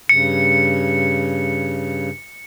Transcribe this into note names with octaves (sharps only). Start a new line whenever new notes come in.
G2 C#3 C#7